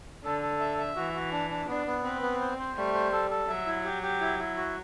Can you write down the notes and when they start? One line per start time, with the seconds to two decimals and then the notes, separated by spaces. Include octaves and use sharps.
0.24 D3 A4
0.42 A4
0.60 E5
0.78 E5
0.96 E3 F#4
1.14 F#4
1.32 D4
1.50 D4
1.68 B3 D4
1.86 B3
2.04 C4 B4
2.22 B3
2.41 C5
2.59 C5
2.76 G3 A3
2.94 C5
3.12 A4
3.30 A4
3.48 F#3 E5
3.67 E4
3.85 G4
4.02 G4
4.21 E4
4.39 E4
4.57 F#4